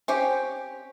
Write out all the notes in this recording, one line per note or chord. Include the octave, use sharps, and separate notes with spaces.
C4 C#4 G4